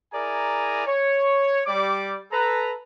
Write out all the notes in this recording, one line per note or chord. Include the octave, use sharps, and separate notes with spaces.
E4 G#4 A#4 D5 G#5 A#5
C#5
G3 D5 D6
A4 B4 A#5